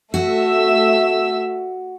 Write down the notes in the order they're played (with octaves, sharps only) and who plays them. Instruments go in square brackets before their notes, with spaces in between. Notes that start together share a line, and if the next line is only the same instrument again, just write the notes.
[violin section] A3 E5 E6 [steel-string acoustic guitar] F#4